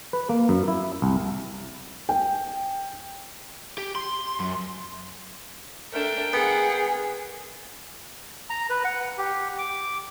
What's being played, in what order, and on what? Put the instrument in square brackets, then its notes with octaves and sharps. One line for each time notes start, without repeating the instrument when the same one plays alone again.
[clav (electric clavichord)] B4
A#3
F#2
E4
C2
[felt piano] G5
[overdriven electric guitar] G4
C6
F#2
[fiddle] A3 D4 [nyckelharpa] A#4 G5
[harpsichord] B3 [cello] G#4 [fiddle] F#5
[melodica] A#5
B4
F#5
G4
D6